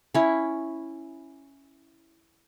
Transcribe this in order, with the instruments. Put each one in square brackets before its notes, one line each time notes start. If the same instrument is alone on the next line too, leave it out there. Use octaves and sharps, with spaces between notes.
[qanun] C#4 E4